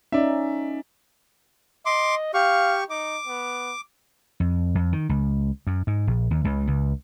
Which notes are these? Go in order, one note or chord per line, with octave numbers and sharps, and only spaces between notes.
C#4 D#4 D5 E5
D#5 C6 D6
G4 F5 C#6
D#4 D6
B3
F2
F2
D#3
C#2
F#2
G#2
A#1
D#2
C#2
C#2